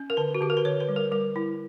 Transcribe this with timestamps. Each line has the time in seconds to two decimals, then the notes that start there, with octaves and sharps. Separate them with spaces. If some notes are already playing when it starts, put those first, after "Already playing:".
Already playing: C#4
0.10 A#4
0.17 D3 B4
0.35 F#4
0.40 D3 G4
0.50 A#4
0.57 B4
0.65 D3 C#5
0.80 B4
0.89 G3
0.96 A#4
1.12 G3 A#4
1.35 G3 E4